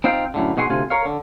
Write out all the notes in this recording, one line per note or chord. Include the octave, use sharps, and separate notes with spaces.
C4 D#4 F4 C5 F5 G5
F#2 A2 D3
B2 D#4 F#4 G#4 F5 C6
D2 C3 F4 G#5
A#4 C#5 F5
D3